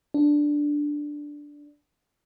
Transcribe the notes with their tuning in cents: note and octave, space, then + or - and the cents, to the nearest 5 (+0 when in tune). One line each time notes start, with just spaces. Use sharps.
D4 +0